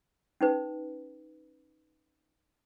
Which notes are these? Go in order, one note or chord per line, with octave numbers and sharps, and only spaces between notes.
C#4 D#4 B4